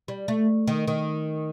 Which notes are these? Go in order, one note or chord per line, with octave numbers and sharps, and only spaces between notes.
G3
A3
D#3
D#3